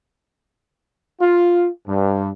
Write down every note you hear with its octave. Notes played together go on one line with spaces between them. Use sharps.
F4
G2